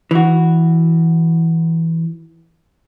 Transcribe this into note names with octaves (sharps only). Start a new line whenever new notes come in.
E3 F#4